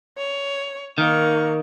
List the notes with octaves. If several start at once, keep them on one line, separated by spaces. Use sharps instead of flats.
C#5
D#3 A#3 C#6